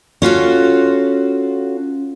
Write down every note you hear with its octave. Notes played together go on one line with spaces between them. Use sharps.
C#4 F4 F#4 A4